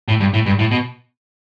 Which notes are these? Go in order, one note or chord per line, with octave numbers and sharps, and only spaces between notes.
A2
G2
A2
G2
A2
B2